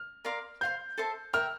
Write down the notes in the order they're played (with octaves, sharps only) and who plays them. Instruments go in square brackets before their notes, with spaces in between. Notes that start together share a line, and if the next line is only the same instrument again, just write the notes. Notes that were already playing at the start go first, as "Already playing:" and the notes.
Already playing: [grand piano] F6
[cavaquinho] A#4 D5 F5 C6
[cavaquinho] C5 F5 C6 [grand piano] G6
[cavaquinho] A4 C5 E5 A5
[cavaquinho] A#4 E5 G5 [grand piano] F6